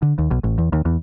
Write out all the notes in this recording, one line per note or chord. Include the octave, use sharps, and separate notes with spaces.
D3
D#2
B1
A1
E2
D#2
E2